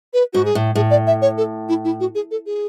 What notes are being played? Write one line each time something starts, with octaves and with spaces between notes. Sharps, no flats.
B4
G#2 F#4
G#4
A2
A2 G#4
D5
E5
C#5
A4
E4
E4
F#4
G#4
A4
G#4